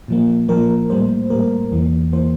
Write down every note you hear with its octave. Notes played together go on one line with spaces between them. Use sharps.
A#2 F3 A#3
A#2 F3 A#3 A#4
A2 G3 A#3 C5
A2 G3 A#3 A#4
E2 E3 A#3
E3 A#3 C5